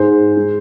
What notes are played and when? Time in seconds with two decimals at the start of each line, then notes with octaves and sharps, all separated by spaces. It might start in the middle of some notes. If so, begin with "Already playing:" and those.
Already playing: G#2 G#3 C5
0.37 G#3